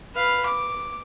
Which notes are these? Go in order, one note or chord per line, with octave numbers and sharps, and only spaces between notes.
B4 F5
D6